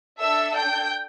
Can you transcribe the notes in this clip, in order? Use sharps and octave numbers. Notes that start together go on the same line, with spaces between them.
D4 A4 E5 E6
G5 G6